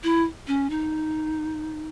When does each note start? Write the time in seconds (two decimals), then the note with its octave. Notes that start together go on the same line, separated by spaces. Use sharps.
0.04 E4
0.47 C#4
0.70 D#4